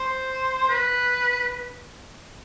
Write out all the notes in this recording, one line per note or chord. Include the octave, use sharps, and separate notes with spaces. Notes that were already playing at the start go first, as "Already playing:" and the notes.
Already playing: C5
B4